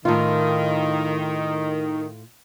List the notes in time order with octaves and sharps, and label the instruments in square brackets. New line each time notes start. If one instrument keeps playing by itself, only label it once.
[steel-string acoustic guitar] A2 F4 [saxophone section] D#3